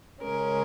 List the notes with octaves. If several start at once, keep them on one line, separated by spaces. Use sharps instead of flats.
C#3 G#3 C#4 A#4